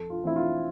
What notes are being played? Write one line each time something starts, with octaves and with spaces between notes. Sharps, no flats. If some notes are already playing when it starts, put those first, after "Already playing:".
Already playing: F2 A4
F4
E3 A3 C4 E4
F4